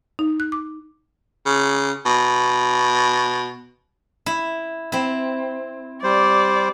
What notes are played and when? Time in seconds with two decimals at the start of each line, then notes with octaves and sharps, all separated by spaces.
0.19 D#4
0.40 F#6
0.52 D6
1.46 C#3
2.06 B2
4.26 E4
4.92 C4 E4
6.03 G3 C5 D5